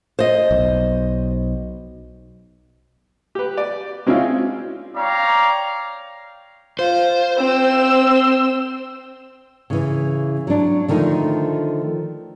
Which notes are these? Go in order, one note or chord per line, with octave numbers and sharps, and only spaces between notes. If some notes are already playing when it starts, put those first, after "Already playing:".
C5 D#5
B1
G4 B4
D5
G#3 C4 C#4 E4 F4
C#5 D5 F5 G5 A#5
F4 C5
C4 E6
C#3 E3
F#3 D4
D3 D#3 F3 A3 D#4